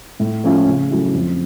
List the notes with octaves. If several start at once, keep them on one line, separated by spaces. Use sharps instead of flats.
A2
F3 A3 C#4 F4
C#3
F#3 A3 C#4 E4
F2